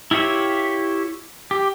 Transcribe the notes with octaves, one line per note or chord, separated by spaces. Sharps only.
E4 F4 G4 C#5 E5
G4